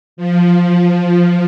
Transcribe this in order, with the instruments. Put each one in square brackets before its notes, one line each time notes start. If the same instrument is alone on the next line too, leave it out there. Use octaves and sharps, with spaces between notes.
[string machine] F3